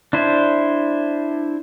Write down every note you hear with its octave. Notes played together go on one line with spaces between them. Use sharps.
D4 E4 C5